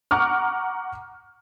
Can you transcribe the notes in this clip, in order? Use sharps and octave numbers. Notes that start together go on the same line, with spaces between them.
F#5 A#5 C#6 D6 F6